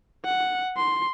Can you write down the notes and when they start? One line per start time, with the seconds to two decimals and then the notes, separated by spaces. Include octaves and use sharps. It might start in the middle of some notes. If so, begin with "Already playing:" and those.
0.25 F#5
0.77 C6